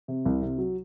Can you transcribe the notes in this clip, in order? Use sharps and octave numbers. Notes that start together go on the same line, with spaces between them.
C3
C2
C3
F#3